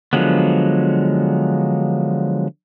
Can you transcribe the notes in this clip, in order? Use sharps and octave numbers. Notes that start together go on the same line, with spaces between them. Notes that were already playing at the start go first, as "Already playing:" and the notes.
D3 F3 F#3 G#3 B3